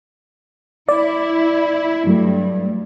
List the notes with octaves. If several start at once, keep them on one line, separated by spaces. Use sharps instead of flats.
E4 D5
G2 F#3 A3